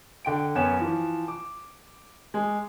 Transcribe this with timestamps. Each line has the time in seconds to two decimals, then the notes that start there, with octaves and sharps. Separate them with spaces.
0.25 D3 G5 D7
0.55 F#2 B3 C#5 E7
0.79 E3 F3
1.28 D6
2.34 G#3